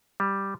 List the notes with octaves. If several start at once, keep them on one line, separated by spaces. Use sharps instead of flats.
G3